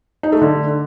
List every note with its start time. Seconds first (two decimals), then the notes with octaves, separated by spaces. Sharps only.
0.23 D#4
0.32 A3
0.41 D3